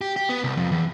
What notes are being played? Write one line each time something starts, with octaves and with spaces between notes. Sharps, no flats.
G4
G4
B3
C2
F2
E2